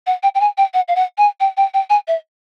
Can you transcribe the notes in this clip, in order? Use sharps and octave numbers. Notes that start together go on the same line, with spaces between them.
F#5
G5
G5
G#5
G5
F#5
F5
F#5
G#5
G5
G5
G5
G#5
E5